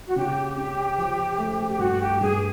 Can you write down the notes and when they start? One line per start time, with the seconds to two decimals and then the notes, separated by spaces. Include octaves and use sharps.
0.06 F#4
0.16 C#3 G4
0.57 C#4
0.98 F3
1.38 A3
1.68 G4
1.79 G2 F#4
2.00 G4
2.20 G2 G#4